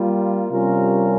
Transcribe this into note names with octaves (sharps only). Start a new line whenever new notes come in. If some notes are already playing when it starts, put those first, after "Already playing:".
Already playing: G3 A#3 F4
C3 G3 C#4 F4 A#4